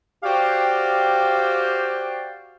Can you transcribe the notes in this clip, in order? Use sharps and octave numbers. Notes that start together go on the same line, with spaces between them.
F#4 G4 C5 D5 F5 G5